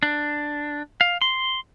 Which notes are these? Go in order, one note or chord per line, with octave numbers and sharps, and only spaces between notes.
D4
F5
C6